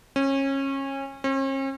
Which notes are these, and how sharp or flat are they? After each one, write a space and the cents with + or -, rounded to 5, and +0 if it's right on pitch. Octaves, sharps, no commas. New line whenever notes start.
C#4 -25
C#4 -45